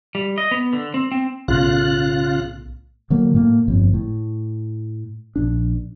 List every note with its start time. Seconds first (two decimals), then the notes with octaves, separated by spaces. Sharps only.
0.15 G3
0.38 D#5
0.51 B3
0.73 D3
0.94 C4
1.11 C4
1.48 B1 A2 C#3 F4 F#6
3.10 D3 F#3 A#3
3.34 A2 A#3
3.68 G1 F2
3.94 A2
5.36 A#1 D4